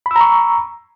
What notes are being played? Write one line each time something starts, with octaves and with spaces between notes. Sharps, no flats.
A#5 B5 C#6 E6